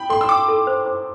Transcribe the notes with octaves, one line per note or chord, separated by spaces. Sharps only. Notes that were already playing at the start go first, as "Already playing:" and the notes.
Already playing: G5 B5
A4 C6
E6
G5 D6
A4
C5
C5